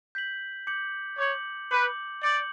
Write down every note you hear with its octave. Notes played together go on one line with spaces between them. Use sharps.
G6 B6 F#7
D6 G6 C#7 F#7
C#5 D6 G6 C#7 F#7
B4 D6 G6 C#7 F#7
D5 D6 G6 C#7 F#7